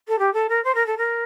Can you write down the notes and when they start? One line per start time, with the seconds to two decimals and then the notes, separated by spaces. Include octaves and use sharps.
0.08 A4
0.18 G4
0.33 A4
0.49 A#4
0.64 C5
0.74 A#4
0.86 A4
0.97 A#4